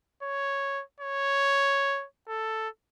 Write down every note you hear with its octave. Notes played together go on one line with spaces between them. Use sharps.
C#5
C#5
A4